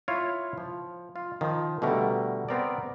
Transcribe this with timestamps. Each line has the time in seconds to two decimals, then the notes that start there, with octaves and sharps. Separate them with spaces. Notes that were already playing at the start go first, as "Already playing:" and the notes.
0.08 E4 F4 C#5
0.58 F3
1.16 F4
1.41 D#3 F3
1.82 B2 D3 G3 A3 A#4
2.49 B3 C4 A#4 C5 D5